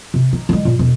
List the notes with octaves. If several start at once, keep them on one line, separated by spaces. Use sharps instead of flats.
C3
D#4
D3 G#3
A#2
E1